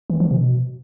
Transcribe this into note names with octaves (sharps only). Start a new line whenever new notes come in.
E3
F3
B2